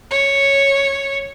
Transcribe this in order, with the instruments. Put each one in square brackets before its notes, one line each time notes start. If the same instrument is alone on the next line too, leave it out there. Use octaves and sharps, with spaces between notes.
[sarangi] C#5